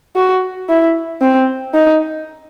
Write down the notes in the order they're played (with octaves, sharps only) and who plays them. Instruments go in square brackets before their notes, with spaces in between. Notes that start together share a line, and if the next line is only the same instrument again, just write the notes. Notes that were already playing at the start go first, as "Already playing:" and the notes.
[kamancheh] F#4
E4
C4
D#4